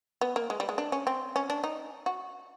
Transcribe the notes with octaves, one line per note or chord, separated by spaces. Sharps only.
B3
A#3
G#3
G3
G#3
D4
C#4
C4
C#4
D4
D#4
F#4